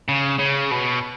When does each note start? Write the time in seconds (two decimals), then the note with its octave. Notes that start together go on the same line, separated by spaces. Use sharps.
0.09 C#3
0.39 C#3
0.71 B2